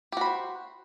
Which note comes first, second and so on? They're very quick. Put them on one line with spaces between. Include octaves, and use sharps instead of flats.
G4 F#4 B5 C5